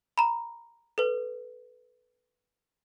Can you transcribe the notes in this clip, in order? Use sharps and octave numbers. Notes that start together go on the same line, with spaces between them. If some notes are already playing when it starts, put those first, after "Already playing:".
A#5 B5
A4 B4